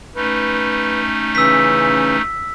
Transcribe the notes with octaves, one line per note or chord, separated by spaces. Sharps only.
A3 C#4 D#4 B4
C#3 E3 E6 B6